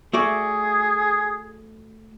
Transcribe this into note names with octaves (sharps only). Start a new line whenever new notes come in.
A3 F#4 G#4 D5